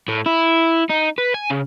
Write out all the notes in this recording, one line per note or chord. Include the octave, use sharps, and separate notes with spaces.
A2
E4
D#4
B4
G#5
C#3